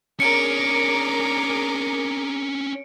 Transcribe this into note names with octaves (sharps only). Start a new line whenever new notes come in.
C#4 D4 G#4 A#4 D6 C#7 D7